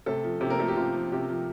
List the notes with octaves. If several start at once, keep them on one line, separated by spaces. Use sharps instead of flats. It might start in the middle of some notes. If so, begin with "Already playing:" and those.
C3 A3 A4
F3
C3 G4
A#3 A#4
F3 A3 A4
G4
C3 F4
F3
C3 G4
F3